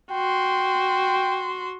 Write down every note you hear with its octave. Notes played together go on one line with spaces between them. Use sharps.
F#4 G5 C6